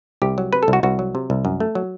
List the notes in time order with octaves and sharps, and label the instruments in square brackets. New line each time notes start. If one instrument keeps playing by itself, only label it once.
[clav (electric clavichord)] C2 G4
F#3
C3 B4
A4
C2
F#4
C2 F#4
F#3
C3
C2
F#2
A3
F#3